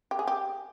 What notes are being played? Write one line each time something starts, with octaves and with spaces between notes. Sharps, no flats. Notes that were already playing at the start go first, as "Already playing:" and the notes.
G4
G#4
G4